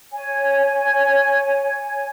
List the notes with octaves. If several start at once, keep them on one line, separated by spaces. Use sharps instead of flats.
C#5 G#5